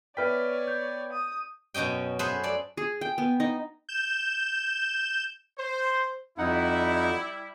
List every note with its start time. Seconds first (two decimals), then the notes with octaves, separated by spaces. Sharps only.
0.17 B3 B4 C#5 D5 E5 G5 F6 B6
0.67 G6
1.13 D#6
1.74 F#2 B2 C#4 D#5 G5
2.19 G#4 A4 B4 C5 E5
2.43 A4 D5
2.77 G#4
3.01 G5
3.18 B3
3.40 D#4
3.89 G6 E7
5.59 C5
6.38 F2 G3 D#4 E4 F#5